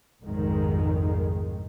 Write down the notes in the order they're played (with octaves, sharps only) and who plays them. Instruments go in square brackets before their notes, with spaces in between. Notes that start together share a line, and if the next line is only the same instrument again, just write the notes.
[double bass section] F1 A#1 F2 G#2 D#3 G#3